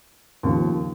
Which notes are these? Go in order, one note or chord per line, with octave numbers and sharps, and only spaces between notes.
D#2 C#3 F3